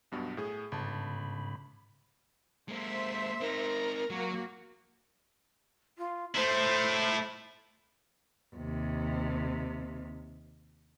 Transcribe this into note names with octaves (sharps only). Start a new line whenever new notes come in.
B1 G2 B2
A2 G#4
G1 G#2 C#3 A5 B5
G#3 A#3 C5 E5
C4 D#4 A#4
F#3 A#3 F#4
F4
A3 E4 C5
D#2 C3